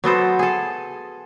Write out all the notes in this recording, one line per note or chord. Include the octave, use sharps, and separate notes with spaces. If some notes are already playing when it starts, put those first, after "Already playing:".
F#3 B3 A4 C5
G#4 A4